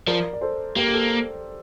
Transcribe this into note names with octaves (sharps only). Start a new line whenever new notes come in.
F3 A#4 D5
D5
A4 C5
A#3 G4 A#4
G4
A4